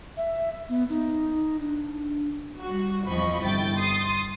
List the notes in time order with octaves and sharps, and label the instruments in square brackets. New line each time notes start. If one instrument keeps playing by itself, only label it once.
[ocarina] E5
B3
D#4
D4
[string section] G3 F#4
E2 F3 C4 D#5 B5 C#6
G1 C2 E4 G5 A6
C6 D#6 A6 C7